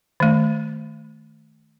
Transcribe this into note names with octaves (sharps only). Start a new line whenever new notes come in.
D#3 A3